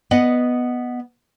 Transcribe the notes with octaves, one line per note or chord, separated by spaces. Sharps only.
B3 D#5 F#5